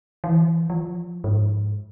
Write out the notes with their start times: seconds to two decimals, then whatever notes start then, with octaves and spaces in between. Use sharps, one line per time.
0.24 E3
0.70 F3
1.24 G#2